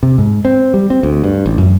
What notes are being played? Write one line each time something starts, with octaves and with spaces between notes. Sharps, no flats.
C3
G#2
C4
G3
C4
D2
G2
A1
F#2